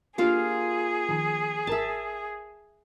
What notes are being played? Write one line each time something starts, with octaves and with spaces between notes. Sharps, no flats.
A#3 D4 F4 G4 G#4 F5
D#3 F3
G#1 A#4 E5 A5